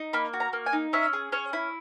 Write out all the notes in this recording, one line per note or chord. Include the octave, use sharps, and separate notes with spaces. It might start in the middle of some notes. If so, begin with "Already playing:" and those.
Already playing: D#4
A#3 B5
F#4
A#5
A#3
G#5
D#4
C#4 E5
G#4
C#4 C#5
E4